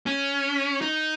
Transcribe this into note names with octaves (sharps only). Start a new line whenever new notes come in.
C#4
D#4